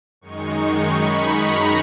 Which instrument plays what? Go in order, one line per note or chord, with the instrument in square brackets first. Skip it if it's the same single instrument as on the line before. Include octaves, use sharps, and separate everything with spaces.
[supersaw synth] F#2 D#3 G#3 D#4 C#6
C#6
B5
A#5